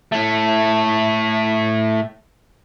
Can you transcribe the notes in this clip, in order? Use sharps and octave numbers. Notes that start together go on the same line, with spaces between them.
A2 A3